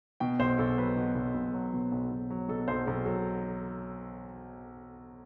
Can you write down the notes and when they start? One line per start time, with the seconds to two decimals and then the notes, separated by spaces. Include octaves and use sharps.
0.20 B2 G5
0.39 B1 C5
0.58 B1 A4
0.78 F#3 B4
0.97 B2
1.15 B1
1.35 B1
1.54 F#3
1.73 B2
1.92 B1
2.11 B1
2.30 F#3
2.49 B2 A4
2.68 B1 C5
2.87 B1 A4
3.06 F#3 A4